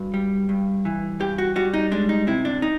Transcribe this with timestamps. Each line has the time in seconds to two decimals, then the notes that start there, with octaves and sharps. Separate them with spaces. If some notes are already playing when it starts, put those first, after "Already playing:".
Already playing: G2 F#4
0.14 G3
0.49 G2
0.85 E3
1.20 G2 G4
1.38 F#4
1.56 G3 F#4
1.74 D#4
1.91 G#3 D4
2.09 D#4
2.27 C3 E4
2.45 D4
2.62 D#4